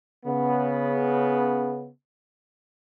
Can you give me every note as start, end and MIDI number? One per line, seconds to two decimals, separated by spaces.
0.25 1.89 49
0.25 1.89 59